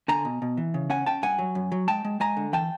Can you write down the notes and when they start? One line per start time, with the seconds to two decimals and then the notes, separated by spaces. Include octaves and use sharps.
0.08 D3 G#5 A#5
0.25 B2
0.42 B2
0.57 E3
0.74 C#3
0.90 C#4 F#5 G#5
1.06 C#4 G5 A5
1.23 G2 F#5 G#5
1.39 F#3
1.55 F#2
1.72 F#3
1.88 G#3 G5 A5
2.05 G#3
2.20 G#3 G#5 A#5
2.37 D3
2.53 E3 G5 A5